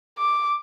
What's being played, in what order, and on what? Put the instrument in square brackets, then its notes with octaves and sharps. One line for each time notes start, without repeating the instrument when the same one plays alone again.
[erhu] D6